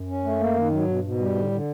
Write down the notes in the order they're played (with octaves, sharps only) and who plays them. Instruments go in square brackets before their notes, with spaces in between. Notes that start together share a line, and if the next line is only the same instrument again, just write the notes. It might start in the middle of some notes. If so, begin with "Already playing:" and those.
Already playing: [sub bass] F#2
[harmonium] C#4
A3
A#3
D#3
F#3
[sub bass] G#2
[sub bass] G2 [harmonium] B2
[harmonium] B2
[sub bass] G#2
[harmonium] G3
[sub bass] G2
[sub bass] G#2 [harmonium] D3
[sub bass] A2 [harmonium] D3